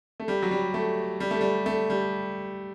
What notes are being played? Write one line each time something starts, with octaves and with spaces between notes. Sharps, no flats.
A3
G3
F#3
G3
A3
G3
A3
G3
A3
G3